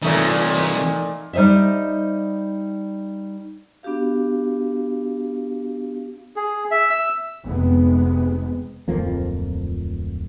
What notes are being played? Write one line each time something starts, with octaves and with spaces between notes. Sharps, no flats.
C2 A#2 E3 A3 D#4
G3 D#4 C5 D#5 E5
B3 D4 F#4 G4 F5
G#4
E5
E6
F1 C3 G#3 B3
D1 F2 F3 A#3